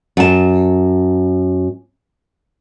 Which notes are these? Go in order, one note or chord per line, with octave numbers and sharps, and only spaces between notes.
F#2 A5